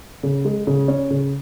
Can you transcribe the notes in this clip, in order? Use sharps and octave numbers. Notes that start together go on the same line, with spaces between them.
C#3
G#3
C#3
C#4
C#3